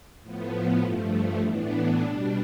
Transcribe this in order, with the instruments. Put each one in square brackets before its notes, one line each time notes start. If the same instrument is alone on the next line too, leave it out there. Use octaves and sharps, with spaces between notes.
[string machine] A2 F3 B3
G2 F3 A3
A2 E3 B3 D4
B2 G3 D4